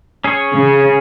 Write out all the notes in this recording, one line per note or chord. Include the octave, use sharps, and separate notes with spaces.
C#4 G#4 C#5
C#3